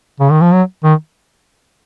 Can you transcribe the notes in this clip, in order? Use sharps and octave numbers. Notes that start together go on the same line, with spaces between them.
C#3
D#3
F3
F#3
D#3